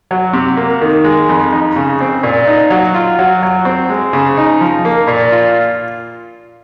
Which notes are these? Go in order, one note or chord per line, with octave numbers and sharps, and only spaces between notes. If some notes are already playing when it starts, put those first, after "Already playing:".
F#3
C3
A#3
D#3
G#3
F2
D#4
C#3
C4
A#2
D#4
F#3
F4
F#3
F#3
C4
G#3
C#3
D#4
F3
A#3
A#2
F4